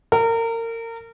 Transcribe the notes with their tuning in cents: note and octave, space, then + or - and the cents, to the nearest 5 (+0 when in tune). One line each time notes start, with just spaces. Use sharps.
A#4 -30